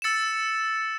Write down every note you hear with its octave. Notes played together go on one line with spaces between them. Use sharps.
E6 A6 C#7 E7